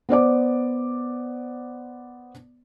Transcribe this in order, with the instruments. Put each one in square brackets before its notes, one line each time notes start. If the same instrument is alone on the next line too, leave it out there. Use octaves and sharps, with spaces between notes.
[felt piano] B3 C5 D5 D6